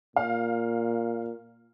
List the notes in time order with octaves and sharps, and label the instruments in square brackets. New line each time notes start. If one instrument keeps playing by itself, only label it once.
[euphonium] A#2 [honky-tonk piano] F5